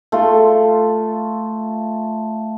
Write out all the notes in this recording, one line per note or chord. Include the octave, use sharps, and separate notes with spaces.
A3 F4